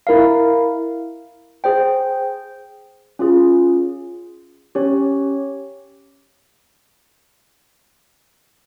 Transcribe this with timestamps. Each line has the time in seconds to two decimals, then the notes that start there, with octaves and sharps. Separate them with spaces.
0.07 E4 A#4 F5
1.64 G#4 C5 G5
3.19 C#4 F4 G#4
4.75 C#4 G4 C#5